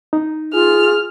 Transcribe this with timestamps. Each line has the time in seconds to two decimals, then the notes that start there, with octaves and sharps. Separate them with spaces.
0.13 D#4
0.54 F4 G#4 F6